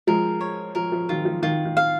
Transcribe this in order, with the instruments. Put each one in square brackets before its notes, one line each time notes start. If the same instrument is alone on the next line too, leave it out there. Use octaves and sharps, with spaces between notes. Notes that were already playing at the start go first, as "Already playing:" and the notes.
[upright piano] F3 G#3 [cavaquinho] A#4
[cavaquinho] C#5
[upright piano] F3 [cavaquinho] A#4
[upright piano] F3
[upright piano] D#3 F#3 [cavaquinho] F4
[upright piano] F3
[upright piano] D#3 [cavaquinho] F4
[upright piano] D#3
[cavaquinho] F5